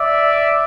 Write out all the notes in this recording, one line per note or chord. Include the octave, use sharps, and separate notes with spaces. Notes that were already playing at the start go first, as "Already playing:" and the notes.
Already playing: D5 E5